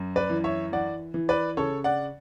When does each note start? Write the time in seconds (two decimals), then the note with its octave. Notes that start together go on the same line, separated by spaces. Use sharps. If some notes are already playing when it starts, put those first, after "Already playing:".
Already playing: F#2
0.16 B4 D5
0.30 E3
0.44 C#5 E5
0.72 E3 D5 F#5
1.14 E3
1.29 B4 D5
1.57 C#3 A4 C#5
1.84 D5 F#5